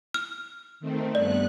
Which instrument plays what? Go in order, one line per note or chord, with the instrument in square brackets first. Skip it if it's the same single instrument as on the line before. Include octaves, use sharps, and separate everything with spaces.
[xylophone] F6
[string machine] D#3 A3 C4
[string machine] G2 B3 F#6 [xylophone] D5